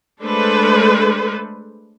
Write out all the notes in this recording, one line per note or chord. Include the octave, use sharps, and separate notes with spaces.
G#3 A3 D4 A4 B4 C5